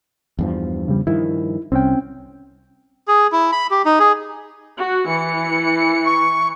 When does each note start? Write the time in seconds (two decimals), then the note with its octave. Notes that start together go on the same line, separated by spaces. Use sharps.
0.39 E2 G2 F3
0.88 C#3 G3
1.07 G2 D#3 F3 E4
1.72 C2 C4 C#4 G5
3.08 G#4
3.32 E4
3.52 B5
3.71 G4
3.85 D#4
4.00 G#4
4.78 F#4
5.08 E3 C#7
6.06 C#6